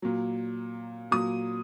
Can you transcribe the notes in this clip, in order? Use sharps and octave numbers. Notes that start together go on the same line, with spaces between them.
A#2 F#3
A#2 F#3 D#6